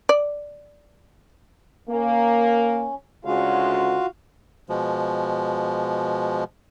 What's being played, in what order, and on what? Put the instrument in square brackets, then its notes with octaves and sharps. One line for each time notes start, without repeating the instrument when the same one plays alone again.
[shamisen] D5
[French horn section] A#3 [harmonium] C#4
[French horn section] D2 C#3 G#3 [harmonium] F4 F#4 F5
[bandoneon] B2 F3 G#3